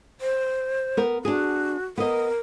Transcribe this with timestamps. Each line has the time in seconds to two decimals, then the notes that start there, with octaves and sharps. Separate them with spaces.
0.21 C5
0.97 B3 A#4
1.25 D4 F#4 G#4
1.98 B3 A#4 D#5